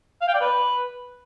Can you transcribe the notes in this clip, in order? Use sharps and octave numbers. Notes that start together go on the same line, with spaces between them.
F5
G5
D5
B4